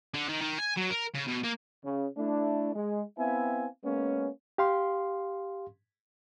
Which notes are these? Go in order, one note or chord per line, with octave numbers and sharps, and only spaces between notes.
D3
D#3
D#3
G#5
F#3
A#4
C#3
B2
A#3
C#3
A3 D4 E4
G#3
B3 C4 E4 E5 F5 G#5
G#3 A#3 B3 C#4
G4 F5 C6